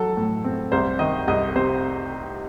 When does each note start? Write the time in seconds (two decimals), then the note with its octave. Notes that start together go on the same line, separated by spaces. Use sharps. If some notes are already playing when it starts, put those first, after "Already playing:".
Already playing: F#3 A4
0.17 A2
0.44 C4
0.72 C2 C5
0.99 D#3 D#5
1.28 C2 D#5
1.56 C3 C5